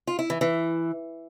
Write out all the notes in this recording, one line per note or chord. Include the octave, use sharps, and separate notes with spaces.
F4
E4
E3
E3